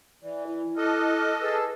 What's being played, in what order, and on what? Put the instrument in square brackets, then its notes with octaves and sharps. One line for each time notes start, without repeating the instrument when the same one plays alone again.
[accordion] E3 [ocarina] D5
[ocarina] E4
[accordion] A4 D#5 [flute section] D6 F6 F#6
[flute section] G#4 A5 E6 [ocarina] B4